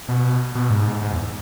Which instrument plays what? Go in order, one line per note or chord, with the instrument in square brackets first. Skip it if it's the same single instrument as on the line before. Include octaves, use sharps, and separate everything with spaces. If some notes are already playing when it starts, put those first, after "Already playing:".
[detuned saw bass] B2
B2
G#2
G#2
E2